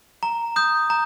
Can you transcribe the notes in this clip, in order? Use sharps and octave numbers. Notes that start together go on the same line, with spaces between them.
A#5
D#6 G6
A#5